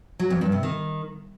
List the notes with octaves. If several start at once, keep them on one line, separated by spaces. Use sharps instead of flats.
F#3
F2
G2
C3
D#3